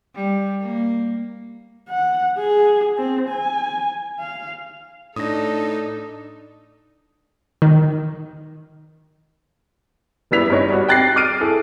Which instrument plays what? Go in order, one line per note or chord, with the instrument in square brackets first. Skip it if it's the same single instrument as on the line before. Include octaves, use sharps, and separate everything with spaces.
[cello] G3
A#3
[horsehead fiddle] F#5
G#4
C4
G#5
F5
[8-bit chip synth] A2 [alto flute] D4 [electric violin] D#4 A4 [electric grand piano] D#6 A#6
[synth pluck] D#3
[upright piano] F#1 G3 B3 E4 B6 F7
G2 D#4 C#5 D#5
G3 F#4
G5 F#6 A6 A#6 C7
D6 F6 D7 D#7
E4 G#4 A4